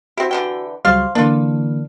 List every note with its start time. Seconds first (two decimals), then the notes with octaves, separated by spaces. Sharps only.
0.17 C4 E4 F#4 G4 E5
0.31 D3 E3 G5
0.85 C#2 F#3 G3 F4 C5 F5
1.15 D3 E3 A#3 D4 F4